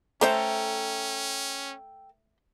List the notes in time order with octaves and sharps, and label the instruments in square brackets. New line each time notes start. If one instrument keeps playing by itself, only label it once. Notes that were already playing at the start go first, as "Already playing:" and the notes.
[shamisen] A3 C5 E5 [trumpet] C#4 [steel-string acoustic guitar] A4 G5 A#5